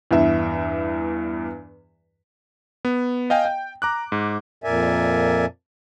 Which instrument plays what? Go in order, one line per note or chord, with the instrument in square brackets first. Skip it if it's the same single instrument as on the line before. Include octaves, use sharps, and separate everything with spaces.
[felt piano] E2 G2 E5
[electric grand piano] B3
D#5 F5 G5 G#5
G5
A#5 D6 F#6
G#2
[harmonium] F2 A#2 A#4 D5 E5 G#5